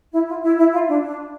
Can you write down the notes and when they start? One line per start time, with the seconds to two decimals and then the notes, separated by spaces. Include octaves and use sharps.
0.13 E4
0.28 F4
0.43 E4
0.58 E4
0.73 F4
0.88 D4
1.03 D4